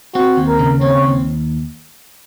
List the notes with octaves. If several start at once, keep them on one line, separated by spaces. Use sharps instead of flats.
C4 F#4
D#2
A#4
C#3
C4 C#5
D#2